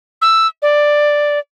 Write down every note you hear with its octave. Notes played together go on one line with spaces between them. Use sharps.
E6
D5